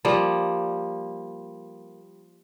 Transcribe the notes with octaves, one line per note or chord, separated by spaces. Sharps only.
F3 G3 A#3